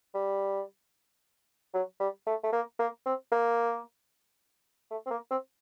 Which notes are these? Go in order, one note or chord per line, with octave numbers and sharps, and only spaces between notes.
G3
F#3
G3
A3
A3
A#3
A#3
C4
A#3
A3
C4
A#3
C4